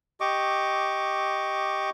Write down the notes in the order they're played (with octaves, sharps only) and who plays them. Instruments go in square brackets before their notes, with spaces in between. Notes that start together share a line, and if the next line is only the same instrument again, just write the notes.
[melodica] G4 D#5 C#6 D6